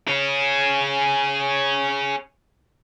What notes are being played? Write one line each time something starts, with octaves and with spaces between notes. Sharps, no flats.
G#4 C#5